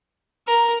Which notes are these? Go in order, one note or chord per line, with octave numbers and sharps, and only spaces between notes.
A#4